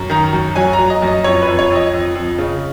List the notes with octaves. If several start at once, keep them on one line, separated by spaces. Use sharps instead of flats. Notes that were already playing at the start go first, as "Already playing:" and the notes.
Already playing: F#2
D#3 A#5
F#2
F#3 G#5
A#5
F#3
D#5
F#2
D#5
F2 C#5
B4
F2
C#5
F2 D#5
F2
F2
C#3